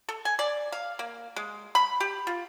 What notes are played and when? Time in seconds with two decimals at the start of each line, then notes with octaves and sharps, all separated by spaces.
0.09 A4
0.25 G#5
0.39 D5
0.72 F5
0.99 A#3
1.36 G#3
1.75 B5
2.00 G4
2.27 F4